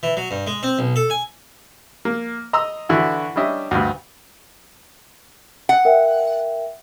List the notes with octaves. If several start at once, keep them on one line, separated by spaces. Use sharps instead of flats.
E3
F#3
G2
G#3
C4
B1
A4
G#5
A#3
D#5 A#5 C6 D#6 E6
D3 E3 E4 F#4
G3 C#4 D4 D#5 E5
D2 G2
F#5
A#4 E5 G5